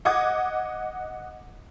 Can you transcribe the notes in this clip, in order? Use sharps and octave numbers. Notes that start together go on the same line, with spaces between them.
D#5 F#5 D6 D#6 G#6